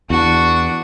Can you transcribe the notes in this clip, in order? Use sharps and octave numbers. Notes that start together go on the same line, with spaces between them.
E2 D4 F#4